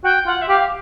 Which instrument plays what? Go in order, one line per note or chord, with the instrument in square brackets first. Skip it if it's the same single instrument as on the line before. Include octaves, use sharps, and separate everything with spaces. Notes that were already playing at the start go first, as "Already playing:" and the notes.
[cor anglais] F#4 [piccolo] G5
[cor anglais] F4 [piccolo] F#5
[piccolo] E5
[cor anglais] G4 [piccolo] F5